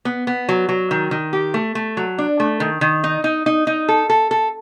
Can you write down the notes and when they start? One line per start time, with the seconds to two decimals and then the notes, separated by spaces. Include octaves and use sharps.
0.05 B3
0.27 B3
0.49 F#3
0.69 F#3
0.91 D#3
1.11 D#3
1.33 G4
1.54 A3
1.75 A3
1.97 F#3
2.18 D4
2.40 A3
2.60 D#3
2.81 D#3
3.04 D#4
3.24 D#4
3.46 D#4
3.67 D#4
3.88 A4
4.10 A4
4.31 A4